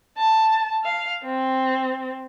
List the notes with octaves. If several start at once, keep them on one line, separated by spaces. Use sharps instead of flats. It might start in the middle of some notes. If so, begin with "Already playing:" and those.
A5
F5
C4